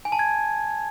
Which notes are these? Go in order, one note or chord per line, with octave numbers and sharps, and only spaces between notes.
G#5
A5
G#6